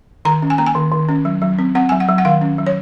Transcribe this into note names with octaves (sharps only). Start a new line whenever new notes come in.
D#3 A#5
C#4
G#5
A#3 A#5
G#5
D#3
D#3
C#4
F#3
F#3
C4
C4 F#5
F#3 G#5
F#5
F#3
F#5
D#3 F5
C#4
F#3
C#5